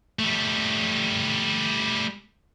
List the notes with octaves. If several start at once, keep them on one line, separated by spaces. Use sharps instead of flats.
G3 A3